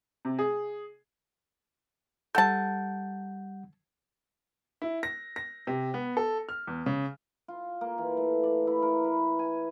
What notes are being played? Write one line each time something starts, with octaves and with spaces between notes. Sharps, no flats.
C3
G#4
G3 A4 F#5 A5 G6
E4
A#6
A#6
C3
B3
A4
F6
E2
C#3
F4
A#3
E3
A3
D5
E4
A#4
B4
G#5